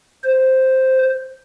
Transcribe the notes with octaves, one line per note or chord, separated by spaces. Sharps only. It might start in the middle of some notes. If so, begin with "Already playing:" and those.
C5